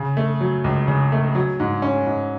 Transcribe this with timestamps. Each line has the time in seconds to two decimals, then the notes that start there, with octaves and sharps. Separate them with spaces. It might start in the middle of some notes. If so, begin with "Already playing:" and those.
Already playing: C#3
0.17 A3
0.41 F#3
0.64 C#2
0.88 C#3
1.12 A3
1.35 F#3
1.60 G#2
1.82 C#4
2.07 G#2